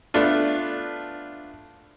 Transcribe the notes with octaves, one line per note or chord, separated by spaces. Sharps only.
A3 B3 D4 F4